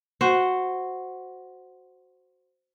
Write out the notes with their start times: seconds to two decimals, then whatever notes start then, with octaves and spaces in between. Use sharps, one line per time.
0.21 F#4 C5